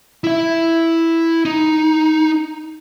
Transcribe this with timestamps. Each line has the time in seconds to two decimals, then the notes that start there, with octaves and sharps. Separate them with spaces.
0.24 E4 E5
1.45 D#4